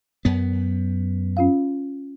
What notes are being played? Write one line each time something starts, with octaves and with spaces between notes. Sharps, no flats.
F#2 B3
C#4 F4 F5